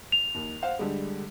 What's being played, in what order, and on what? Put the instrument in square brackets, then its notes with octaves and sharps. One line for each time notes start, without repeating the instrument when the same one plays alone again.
[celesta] F7
[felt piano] D#2
C5 F5 F#5
D3 G3 G#3